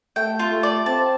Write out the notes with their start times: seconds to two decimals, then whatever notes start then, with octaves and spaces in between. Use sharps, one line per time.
0.16 A3 G5
0.39 F4
0.51 A3
0.63 D5
0.86 C4 A5